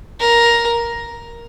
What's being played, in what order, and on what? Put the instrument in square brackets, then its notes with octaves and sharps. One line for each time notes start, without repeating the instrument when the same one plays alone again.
[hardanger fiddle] A#4